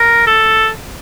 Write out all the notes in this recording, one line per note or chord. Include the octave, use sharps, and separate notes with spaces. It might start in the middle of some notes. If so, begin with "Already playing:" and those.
Already playing: A#4
A4